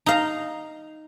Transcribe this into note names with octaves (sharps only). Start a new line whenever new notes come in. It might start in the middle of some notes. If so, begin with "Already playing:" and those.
D#4 F5 A#5